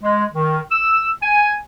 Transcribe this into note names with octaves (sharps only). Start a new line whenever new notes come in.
G#3
D#3
E6
G#5